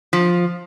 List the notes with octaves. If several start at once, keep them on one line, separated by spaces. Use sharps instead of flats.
F3